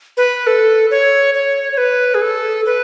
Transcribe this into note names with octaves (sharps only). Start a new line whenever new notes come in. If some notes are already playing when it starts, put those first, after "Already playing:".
B4
A4
C#5
C#5
C#5
B4
G#4
A4
B4